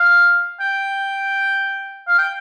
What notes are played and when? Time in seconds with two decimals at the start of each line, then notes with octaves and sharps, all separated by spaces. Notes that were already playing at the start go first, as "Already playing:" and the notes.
Already playing: F5
0.61 G5
2.08 F5
2.19 G5